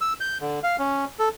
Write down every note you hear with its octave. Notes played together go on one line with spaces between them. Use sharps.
E6
G6
D3
F5
C#4
A4